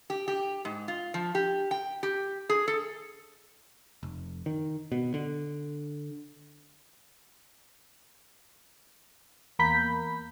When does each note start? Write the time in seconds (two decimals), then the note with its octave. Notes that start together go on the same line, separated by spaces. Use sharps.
0.10 G4
0.28 G4
0.65 G#2
0.88 F4
1.14 F3
1.35 G4
1.71 G5
2.03 G4
2.49 G#4
2.68 A4
4.03 F1
4.46 D#3
4.92 B2
5.14 D3
9.59 E2 A#3 A#4 B5 G6 B6